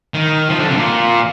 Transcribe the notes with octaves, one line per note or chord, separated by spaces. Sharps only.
D#3
F3
D3
C3
A#2